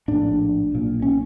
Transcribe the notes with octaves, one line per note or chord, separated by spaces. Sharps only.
A#1 A2 D4
B1 A#2
C#4